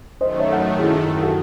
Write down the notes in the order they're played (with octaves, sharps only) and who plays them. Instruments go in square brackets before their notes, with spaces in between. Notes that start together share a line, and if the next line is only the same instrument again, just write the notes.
[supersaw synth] F#2 D#3 A3 [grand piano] C5 D#5
[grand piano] C#5 E5
F#5
C#5 E5
E4 G#4
E4 G#4
F#4 A4